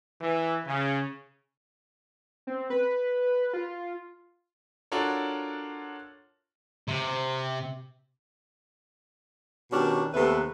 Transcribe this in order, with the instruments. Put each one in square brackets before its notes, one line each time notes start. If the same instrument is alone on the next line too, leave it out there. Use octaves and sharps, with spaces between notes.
[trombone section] E3
C#3
[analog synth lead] C4
B4
F4
[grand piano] D4 F4 F#4 A4 A#4 C#5
[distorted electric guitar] C3
[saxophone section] B2 D#3 C#4 D4 G4
D#2 C3 A3 B3 B4 E5